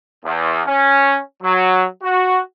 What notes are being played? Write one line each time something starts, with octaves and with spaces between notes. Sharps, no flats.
E2
C#4
F#3
F#4